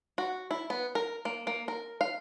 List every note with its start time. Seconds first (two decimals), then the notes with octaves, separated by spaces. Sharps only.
0.18 F#4
0.51 E4
0.70 B3
0.95 A#4
1.25 A#3
1.47 A#3
1.68 A#4
2.01 F5